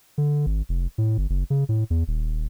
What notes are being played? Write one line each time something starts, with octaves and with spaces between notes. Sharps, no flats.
D3
G#1
F1
A2
G1
F#1
C#3
A2
E2
D#1